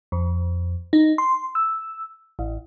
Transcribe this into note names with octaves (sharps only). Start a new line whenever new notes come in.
F2
D#4
C6
E6
A1